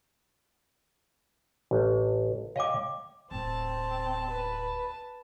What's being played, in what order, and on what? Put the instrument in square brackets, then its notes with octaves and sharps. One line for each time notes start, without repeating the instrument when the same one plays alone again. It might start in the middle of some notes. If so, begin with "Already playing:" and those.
[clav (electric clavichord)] A1
[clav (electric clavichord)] C#5 D#5 G5 [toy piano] F5 D6
[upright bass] D1 [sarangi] C4 [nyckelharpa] A5
[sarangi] B4